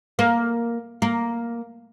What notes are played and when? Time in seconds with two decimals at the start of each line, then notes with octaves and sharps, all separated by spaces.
0.19 A#3
1.02 A#3